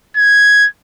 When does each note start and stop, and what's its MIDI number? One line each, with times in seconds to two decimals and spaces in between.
0.17 0.67 92